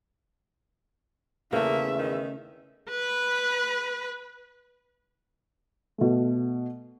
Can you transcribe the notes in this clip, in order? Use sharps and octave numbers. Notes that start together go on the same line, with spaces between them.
E2 C#3 A3 A#3 E5
D#3
B4 B5
B2 A3